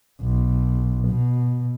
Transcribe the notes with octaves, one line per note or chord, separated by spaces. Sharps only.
B1
B2